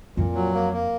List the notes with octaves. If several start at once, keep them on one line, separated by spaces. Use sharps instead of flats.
F2 A#2
F#3
A#3
A#3